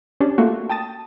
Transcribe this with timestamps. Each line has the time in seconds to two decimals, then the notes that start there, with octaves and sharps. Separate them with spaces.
0.20 C#4 D4 G4
0.38 A3 A#3 F4 F#4
0.69 G5 A5 D#6 A6